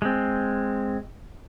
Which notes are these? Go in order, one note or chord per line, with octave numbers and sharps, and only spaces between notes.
G#3 C4